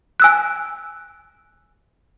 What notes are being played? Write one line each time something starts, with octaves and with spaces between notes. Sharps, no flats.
G#5 E6 F#6